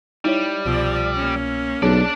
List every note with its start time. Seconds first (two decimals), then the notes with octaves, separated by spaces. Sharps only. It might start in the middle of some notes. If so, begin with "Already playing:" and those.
0.25 G3 D#4 E4 C#5
0.65 C2 B2 F3 D5 E6
1.16 A#3 C#4
1.83 B1 D4 G#4 C#5 D5 A5